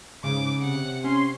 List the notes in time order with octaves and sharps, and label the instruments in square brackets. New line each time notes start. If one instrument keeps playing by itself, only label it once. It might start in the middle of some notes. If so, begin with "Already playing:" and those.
[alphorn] G#2 [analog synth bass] C#3 [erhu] D6
[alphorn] C3 [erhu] F#5
[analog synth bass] C#4 [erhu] C6